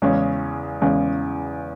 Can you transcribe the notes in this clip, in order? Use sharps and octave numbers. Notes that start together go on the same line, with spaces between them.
E2 C#3 G#3 C#4
E2 C#3 G#3 C#4